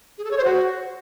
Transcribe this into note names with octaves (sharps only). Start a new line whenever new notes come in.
G#4
A4
C#5
C5
F#4